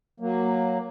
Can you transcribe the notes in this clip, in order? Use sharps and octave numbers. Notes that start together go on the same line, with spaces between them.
F#3 A#3